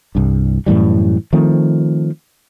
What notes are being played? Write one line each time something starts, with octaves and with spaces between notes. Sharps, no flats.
C2 G2
F#2 A2 E3 G3
D#3 F3 A3 C4